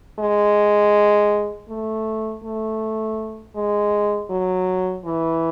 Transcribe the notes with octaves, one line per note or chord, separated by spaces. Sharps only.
G#3
A3
A3
G#3
F#3
E3